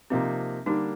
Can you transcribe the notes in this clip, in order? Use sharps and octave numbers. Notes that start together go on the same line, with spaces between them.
C3 F3 A#3 C4 D#4 G4
D3 G3 A#3 D4 D#4